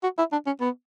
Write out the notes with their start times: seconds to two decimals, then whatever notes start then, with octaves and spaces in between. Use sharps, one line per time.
0.03 F#4
0.18 E4
0.32 D4
0.47 C#4
0.61 B3